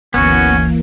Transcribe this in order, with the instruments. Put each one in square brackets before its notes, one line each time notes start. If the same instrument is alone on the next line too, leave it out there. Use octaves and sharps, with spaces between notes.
[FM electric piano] G1 D2 [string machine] E3 A#3 [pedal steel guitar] B3 F#4 [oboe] C#4